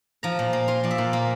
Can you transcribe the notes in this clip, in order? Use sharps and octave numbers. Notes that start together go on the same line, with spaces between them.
F3 A#5
A#2
A#3
F4 C6
F3 D5
E5
A#2
A#3